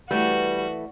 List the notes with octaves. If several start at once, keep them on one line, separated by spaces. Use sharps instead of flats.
E3 G3 A3 F#4 B4